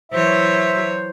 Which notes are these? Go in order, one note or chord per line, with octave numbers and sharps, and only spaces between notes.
E3 F#3 C5 C#5 E5